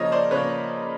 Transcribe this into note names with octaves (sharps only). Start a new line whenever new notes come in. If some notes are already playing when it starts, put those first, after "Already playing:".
Already playing: C#3 F3 A#3 C#5 D#5
C5 D5
C#3 F3 A#3 B4 C#5